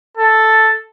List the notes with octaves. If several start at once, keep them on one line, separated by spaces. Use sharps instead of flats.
A4